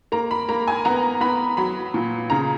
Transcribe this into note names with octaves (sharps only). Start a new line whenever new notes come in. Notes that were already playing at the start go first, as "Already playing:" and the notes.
A#3 A#5
B5
A#3 A#5
G#5
B3 A#5
B3 B5
F#3 B5
A#2
C#3 A#5